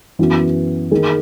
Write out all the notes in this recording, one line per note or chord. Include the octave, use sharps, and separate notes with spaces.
F#2 E3 B3 F#4
D#3 A#3 D#4 G#4